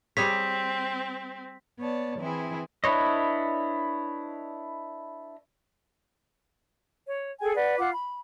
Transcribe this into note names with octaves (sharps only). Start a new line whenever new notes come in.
G3 C4 G#4 C#5 B6
B3 C#5 D5 A5
E3 C4 E4 G#4
D4 E4 B4 C#5 D#5
C#5
G#4 A4 G5 G#5
B4 D5 F#5
F4 F#5 D6
B5